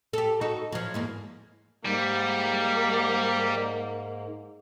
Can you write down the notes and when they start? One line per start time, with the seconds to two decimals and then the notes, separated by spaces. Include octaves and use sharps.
0.13 G4 A4
0.41 D#4 F#4 A4
0.72 F3 F#3
0.94 E2 G#2 A#3
1.85 G#2 G3 A#3